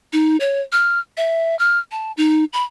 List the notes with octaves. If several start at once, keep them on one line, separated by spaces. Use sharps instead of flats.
D#4
C#5
F6
E5
F6
A5
D#4
B5